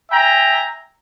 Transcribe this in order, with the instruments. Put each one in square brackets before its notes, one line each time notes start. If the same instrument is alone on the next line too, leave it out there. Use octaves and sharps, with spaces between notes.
[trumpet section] E5 G5 G#5 A#5